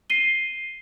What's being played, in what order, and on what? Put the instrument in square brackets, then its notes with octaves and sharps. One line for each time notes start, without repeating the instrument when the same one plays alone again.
[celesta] C7 D#7 G7